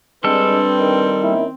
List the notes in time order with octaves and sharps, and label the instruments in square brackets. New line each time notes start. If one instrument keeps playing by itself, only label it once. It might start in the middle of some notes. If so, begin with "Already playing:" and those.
[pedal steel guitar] G3 A4 [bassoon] G#3 [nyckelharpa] C4 [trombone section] D4 B4
[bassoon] D#3
[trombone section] A#3 C#4 E4